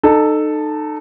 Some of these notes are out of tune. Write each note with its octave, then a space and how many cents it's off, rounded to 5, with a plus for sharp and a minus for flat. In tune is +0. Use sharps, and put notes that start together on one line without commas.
D#4 -30 A4 +0